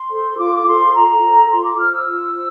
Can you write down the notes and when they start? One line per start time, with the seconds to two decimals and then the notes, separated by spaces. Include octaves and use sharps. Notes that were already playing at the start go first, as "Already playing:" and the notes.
Already playing: C6
0.10 A4 C5
0.38 F4 D6
0.54 D6
0.66 A4 C5 C6
0.94 F4 A#5
1.22 A4 C5
1.50 F4 C6
1.64 D6
1.78 C5 F6
1.91 E6
2.06 F4
2.34 C5